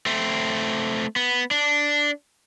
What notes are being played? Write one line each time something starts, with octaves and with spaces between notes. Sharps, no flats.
A3 C4
B3
D4